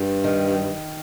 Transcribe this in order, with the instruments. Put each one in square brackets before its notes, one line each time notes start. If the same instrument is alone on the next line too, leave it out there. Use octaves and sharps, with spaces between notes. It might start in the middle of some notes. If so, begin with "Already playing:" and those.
Already playing: [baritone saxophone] G2
[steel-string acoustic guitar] D#3